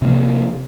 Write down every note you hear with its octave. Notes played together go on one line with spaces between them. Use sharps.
C3 F3 A#3